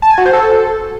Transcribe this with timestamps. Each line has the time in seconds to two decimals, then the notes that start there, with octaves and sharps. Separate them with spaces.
0.02 A5
0.10 G#5
0.18 F#4
0.25 C5
0.33 A4